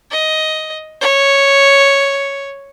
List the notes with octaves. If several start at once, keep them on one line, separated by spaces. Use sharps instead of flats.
D#5
C#5